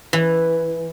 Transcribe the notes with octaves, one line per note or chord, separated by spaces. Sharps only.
E3